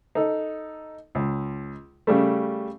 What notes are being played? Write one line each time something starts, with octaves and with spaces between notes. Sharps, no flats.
D#4 A4
C#2
C#3 G3 A3